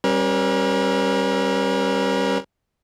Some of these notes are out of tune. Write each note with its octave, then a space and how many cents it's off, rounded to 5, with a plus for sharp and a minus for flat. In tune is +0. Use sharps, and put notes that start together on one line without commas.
G3 -10 C#4 -30 A#4 +40